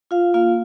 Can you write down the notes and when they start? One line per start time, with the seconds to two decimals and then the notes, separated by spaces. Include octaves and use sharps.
0.11 F4 F5
0.34 A#3 F4 F5